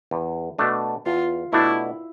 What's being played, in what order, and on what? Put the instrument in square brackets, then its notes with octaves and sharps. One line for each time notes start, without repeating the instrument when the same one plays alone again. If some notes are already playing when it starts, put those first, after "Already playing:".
[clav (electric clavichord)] E2
B2 A3 D4
[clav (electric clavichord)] E2 [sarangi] F4
[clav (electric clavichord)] B2 A3 D4 [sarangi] E4